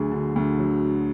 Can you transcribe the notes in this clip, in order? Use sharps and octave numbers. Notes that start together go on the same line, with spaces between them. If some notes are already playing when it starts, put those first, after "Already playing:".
Already playing: D2 F#3 G#4
D3
D2
F#3